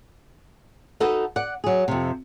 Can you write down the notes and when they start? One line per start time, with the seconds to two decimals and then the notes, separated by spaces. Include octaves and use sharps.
1.00 D#4 F#4 A4 B4 D#5
1.36 D5 F#5
1.64 F#3 G#4
1.88 F2 C3